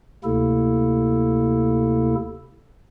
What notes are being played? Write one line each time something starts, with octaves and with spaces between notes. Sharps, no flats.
D2 C3 A#3 E4 A4